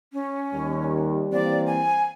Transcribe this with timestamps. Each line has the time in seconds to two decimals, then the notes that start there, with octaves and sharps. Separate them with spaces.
0.13 C#4
0.53 D#2 G3
1.33 E3 A#3 C4 D5
1.66 G#5